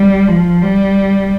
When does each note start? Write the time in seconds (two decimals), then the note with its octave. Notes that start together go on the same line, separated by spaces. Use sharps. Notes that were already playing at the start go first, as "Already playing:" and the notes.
Already playing: G3
0.28 F3
0.62 G3